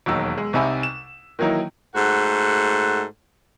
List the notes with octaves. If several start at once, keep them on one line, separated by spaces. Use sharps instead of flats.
E1 D#2 F#3 D#4 E6
G#3
C2 C3 D#4 E5 G#5 B5
E7
D#3 E3 F#3 A#3 D#4 E4
G#2 A3 F#4 A4 F#5